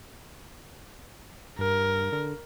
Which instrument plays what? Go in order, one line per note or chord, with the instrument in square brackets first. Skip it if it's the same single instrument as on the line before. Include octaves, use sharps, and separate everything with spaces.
[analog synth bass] G2 [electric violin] A#4
[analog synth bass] D3